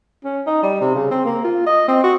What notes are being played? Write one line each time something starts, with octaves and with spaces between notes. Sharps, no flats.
C#4
D#4
G3
C3
C#3
C4
A#3
F4
D#5
C4
F#4